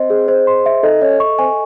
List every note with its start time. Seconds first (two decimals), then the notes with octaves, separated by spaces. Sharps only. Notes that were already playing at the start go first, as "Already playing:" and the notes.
Already playing: C4 D#5
0.10 G#4
0.28 C5
0.47 C6
0.66 E5
0.83 D#4 A4
1.01 C#4 D#5
1.20 C#6
1.39 C4 G#5